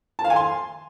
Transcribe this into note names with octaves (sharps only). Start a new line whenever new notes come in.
A5
F5
G#5
C6